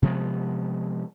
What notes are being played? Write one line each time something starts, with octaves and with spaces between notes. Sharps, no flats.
C3 F3 G#3 B3